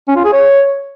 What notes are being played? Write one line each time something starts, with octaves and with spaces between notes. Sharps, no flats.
C#4
F4
G#4
C#5